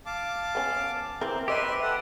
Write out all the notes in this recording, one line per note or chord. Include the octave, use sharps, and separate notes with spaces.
F5 A5 D6
B3 C#4
E3 C4 A#4
G4 B4 C5 D#5 E5 C6
A4 F#5